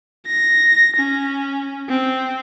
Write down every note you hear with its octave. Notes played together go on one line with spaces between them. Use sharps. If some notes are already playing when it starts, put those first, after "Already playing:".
A#6
C#4
C4